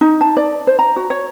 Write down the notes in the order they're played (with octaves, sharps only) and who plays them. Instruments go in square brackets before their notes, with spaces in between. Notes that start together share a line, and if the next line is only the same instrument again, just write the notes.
[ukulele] D#4
A5
D5
C5
A#5
F#4
C#5